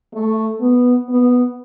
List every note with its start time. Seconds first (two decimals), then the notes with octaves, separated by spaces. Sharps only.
0.14 A3
0.61 B3
1.09 B3